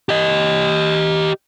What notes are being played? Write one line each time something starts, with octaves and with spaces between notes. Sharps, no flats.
G4 D#5